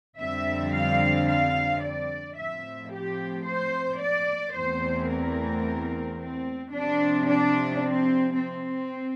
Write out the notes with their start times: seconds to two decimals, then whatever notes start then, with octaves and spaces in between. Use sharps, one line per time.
0.19 F2 D3 G3 C4 E5
0.74 F5
1.29 F5
1.83 D5
2.37 A2 F3 C4 E5
2.92 G4
3.46 C5
4.01 D5
4.56 E2 E3 A3 C4 C5
5.10 A#4
6.19 C4
6.74 C3 F3 C4 D4
7.28 D4
7.83 C4
8.37 C4